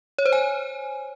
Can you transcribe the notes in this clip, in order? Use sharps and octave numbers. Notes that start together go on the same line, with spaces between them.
C#5
C5
G#5